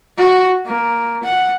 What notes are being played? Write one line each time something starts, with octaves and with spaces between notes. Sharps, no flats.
F#4
A#3
F#5